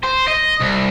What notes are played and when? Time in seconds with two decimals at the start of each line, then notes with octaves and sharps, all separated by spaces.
0.04 C5
0.28 D#5
0.61 C2